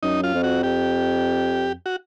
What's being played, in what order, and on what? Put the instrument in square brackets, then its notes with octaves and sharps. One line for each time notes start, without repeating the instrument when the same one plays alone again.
[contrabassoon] F#2 [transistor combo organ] D#4
[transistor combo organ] F4
[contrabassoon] F2
[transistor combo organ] F#4
[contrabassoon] F2 [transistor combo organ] G4
[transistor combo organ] F#4